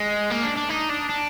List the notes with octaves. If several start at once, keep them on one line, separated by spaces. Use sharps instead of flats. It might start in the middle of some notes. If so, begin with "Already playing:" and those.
Already playing: G#3
A#3
D4
D4
D#4
D4
D4